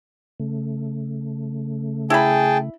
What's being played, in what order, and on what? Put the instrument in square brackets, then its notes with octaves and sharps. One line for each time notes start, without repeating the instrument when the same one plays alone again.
[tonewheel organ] C#3 A3
[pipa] E4 B5 [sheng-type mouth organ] G#4 G5 A5